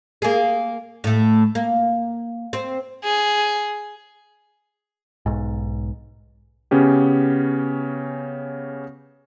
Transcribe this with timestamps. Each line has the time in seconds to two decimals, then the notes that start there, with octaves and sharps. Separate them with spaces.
0.22 A#3 G#4
1.04 A2 A3
1.55 A#3
2.53 C4
3.04 G#4
5.26 B1 G#2
6.71 C#3 B3 C#4 G4